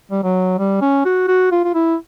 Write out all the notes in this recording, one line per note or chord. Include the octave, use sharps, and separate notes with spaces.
G3
F#3
G3
C#4
F#4
F#4
F4
F4
E4